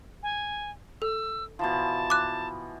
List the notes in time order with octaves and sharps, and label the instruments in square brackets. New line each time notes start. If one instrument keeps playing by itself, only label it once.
[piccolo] G#5
[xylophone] A4 [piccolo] E6
[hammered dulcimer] B2 E3 F3 [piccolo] A5
[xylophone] D6 F#6